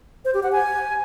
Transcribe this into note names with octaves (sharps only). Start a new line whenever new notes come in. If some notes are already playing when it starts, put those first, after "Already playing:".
C5
G4
F#5
G#5